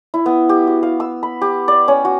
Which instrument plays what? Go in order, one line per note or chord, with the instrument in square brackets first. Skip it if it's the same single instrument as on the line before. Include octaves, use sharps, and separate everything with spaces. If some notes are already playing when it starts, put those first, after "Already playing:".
[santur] E4
B3
G4
F#4
F5
E6
B5
G4
D5
C#4
F#4